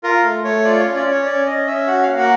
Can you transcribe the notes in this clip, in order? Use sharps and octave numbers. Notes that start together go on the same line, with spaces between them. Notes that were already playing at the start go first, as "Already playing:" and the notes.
F4 A#4
A3
A3 C#5
F4 D5
C#4 C#5
D5
C#4 C#5
C#4 D5
C#4 D#5
C#4 E5
F#4 F#5
A#3 F5
F#5